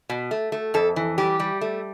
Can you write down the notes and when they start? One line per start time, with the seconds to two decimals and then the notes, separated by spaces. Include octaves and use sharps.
0.09 B2
0.31 A3
0.52 A3
0.74 F2 A4
0.96 E3
1.18 G3 G4
1.40 G3
1.61 A3